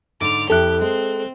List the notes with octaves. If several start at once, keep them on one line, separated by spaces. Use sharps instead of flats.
G#2 D3 D6 F7
F2 E4 G4 A4 F#6
G#3 C4